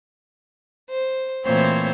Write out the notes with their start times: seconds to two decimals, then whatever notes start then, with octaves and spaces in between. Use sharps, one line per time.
0.90 C5
1.46 A#2 E3 A3 C4 C5 C#5